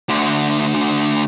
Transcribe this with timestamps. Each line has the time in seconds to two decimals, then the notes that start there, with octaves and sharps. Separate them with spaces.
0.09 D2 D3